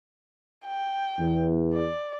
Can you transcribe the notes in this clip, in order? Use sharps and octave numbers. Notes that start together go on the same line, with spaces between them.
G5
E2
D5